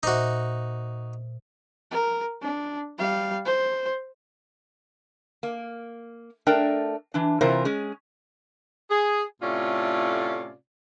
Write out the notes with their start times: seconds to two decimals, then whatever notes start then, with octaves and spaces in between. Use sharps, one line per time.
0.03 A#2 D#4 F#4 C5 E5
1.92 A#4
2.42 D4
2.98 G3 F5
3.45 C5
5.43 A#3
6.47 A3 D4 A#4 D5 G5
7.14 E3 D4
7.41 C3 E3 F4 A#4 C5
7.65 G#3 C#4 G#4
8.90 G#4
9.42 A2 C3 A3 C#4 F4 D5